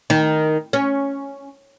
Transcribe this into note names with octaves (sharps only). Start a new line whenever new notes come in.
D#3
C#4